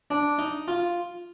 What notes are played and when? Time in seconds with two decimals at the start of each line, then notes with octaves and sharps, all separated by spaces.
0.11 D4
0.39 D#4
0.68 F4